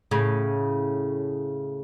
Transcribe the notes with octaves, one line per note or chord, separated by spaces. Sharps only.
A2 C#3